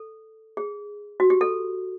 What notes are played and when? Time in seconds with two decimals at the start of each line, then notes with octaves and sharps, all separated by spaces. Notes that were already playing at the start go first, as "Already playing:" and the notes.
Already playing: A4
0.57 G#4
1.20 F#4
1.30 G4
1.41 A4